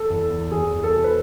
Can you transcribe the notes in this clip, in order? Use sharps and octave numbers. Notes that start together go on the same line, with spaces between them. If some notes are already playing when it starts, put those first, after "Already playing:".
Already playing: A4
E2
E2
E2 G#4
E2
A4
B2
B4